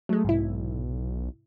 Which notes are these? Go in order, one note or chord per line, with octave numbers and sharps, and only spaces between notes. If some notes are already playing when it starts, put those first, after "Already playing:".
F#3 G#3 A3
B1 G#2 C3 E4